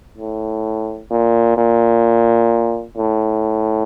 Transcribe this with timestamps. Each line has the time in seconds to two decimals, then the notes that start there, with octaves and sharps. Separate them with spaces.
0.18 A2
1.11 A#2
1.57 A#2
2.98 A2